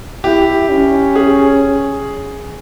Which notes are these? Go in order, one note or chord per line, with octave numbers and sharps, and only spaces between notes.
E4 G4
C#4
G#4